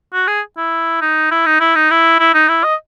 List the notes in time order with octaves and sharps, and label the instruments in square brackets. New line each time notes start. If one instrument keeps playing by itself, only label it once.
[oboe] F#4
G#4
E4
D#4
E4
D#4
E4
D#4
E4
E4
D#4
E4
D#5